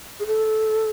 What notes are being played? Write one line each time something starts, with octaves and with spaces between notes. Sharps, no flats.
G#4
A4